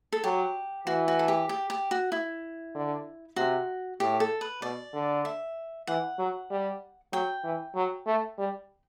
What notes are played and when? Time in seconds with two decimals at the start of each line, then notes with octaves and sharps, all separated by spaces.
0.12 A4
0.24 F#3 G4
0.87 E3 F#4
1.08 F#4
1.19 A4
1.28 G4
1.49 G4
1.70 G4
1.91 F#4
2.12 E4
2.75 D3
3.36 C3 F#4
4.00 A2 G4
4.20 A4
4.41 B4
4.62 B2 D5
4.94 D3
5.25 E5
5.87 E3 F#5
6.19 F#3
6.50 G3
7.13 F#3 G5
7.44 E3
7.75 F#3
8.06 A3
8.38 G3